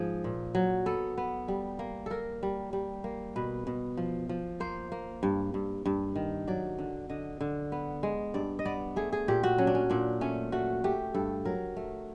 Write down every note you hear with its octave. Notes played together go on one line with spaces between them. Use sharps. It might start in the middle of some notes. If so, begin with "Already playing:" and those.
Already playing: G#2 F3 G#4
A#2
F#3
B3 A4
B3
G3
A#3
A#3 A4 A#4
G3
G3
A#3
B2 B4
B2
F3
F3
A#3 C5
A#3
G2
G2
G2
D#3
F#3 D5
D3
D3 D#5
D3
B3
G#3
G2 D5
D#5
B3 D5
A3 G#4
G#4
A#2 G4
F#4
F#3 C#4
D4
C#4
A#2 D4
A3 C#4
A3 F#4
A3 G4
G2 A4
F#3 A#4
A3